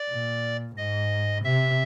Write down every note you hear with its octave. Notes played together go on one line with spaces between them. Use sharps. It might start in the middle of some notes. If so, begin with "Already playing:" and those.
Already playing: D5
A#2
G#2 D#5
C3 E5